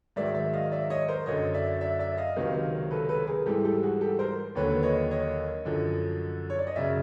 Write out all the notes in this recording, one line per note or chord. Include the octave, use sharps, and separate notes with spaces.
G#2 D#3 F#3 D5 E5
D5 E5
D#5 F5
D5 E5
C#5 D#5
A#4 C5
F#2 D3 F#3 C#5 D#5
D5 E5
D5 E5
D5 E5
D#5 F5
C#2 C3 D#3 F#3
A4 B4
A4 B4
G#4 A#4
G#2 E3 G3 G4 A4
G4 A4
F#4 G#4
G4 A4
A#4 C5
D#2 D3 F#3 B4 C#5
C#5 D#5
C#5 D#5
F#2 D3 F3
C#5
D5
D#5
F#2 C#3 F#3 D5 E5